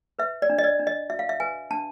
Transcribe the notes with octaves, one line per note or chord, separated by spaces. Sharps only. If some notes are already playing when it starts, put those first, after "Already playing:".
B4 E5
D5
D4
D#5
D5
D4
D#5
F#4 E5
F5
E5
B4 G#5
D4 A5